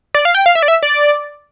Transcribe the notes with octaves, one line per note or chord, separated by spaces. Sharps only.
D5
F5
G5
F5
E5
D5
E5
D5